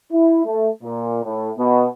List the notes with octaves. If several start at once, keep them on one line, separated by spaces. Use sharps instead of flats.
E4
A3
A#2
A2
B2